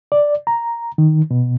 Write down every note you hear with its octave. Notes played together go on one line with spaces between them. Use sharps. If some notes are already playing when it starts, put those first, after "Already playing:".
D5
A#5
D#3
B2